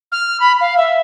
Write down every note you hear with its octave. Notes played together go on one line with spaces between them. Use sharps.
F6
B5
F5
E5